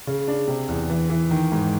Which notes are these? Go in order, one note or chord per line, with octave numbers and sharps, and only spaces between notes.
C#3
D4
C3
E2
E3
E3
D#3
G#2